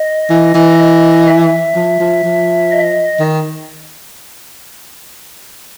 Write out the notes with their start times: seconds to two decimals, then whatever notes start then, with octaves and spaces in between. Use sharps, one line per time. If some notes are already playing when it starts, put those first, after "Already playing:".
Already playing: D#5
0.30 E3
0.54 E3
0.78 D#5
1.27 E5
1.75 F3
2.00 F3
2.24 F3
2.71 D#5
3.20 D#3